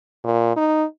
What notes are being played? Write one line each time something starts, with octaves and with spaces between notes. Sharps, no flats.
A#2
D#4